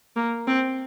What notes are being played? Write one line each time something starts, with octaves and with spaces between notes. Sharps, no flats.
A#3
C4